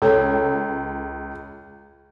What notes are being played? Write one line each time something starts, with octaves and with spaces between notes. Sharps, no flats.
C#2 A4 C#5 G5